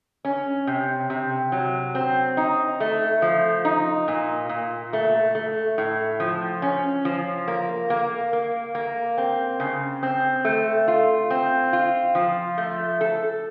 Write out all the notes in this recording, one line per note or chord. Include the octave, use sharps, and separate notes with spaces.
C#4
C3
C3
F#3
C4
D#4
A3
F3
D#4
A#2
A#2
A3
A3
A2
F3
C#4
F3
A#3
A#3
A#3
A#3
C4
C#3
C4
A3
F4
C4
F4
F3
A3
A4